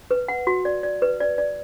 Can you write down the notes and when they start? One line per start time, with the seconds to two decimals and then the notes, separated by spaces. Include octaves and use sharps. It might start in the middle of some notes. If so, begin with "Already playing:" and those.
0.11 B4
0.28 F#5
0.47 F#4
0.65 D5
0.83 D5
1.02 B4
1.20 D5
1.38 D5